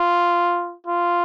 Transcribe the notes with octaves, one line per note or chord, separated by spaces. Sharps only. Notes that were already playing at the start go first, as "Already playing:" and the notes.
Already playing: F4
F4